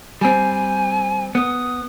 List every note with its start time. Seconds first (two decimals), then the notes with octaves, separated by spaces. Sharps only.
0.21 G3 C4 G#5
1.35 B3 D#6